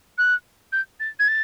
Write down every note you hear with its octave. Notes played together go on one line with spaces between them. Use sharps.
F#6
G6
A6
G#6
A6